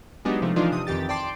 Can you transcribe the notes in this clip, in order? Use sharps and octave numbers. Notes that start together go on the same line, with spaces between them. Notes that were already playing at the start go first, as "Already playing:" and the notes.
F#3 G#3 B3 D4 D#4 G4
C3 F3 A3
E3 F3 D4 D#4 F4
C3 D#6
F2 D#3 E3 G4 A6
D5 G5 A5 C6 D6